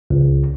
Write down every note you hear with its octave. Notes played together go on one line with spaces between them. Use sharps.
C#2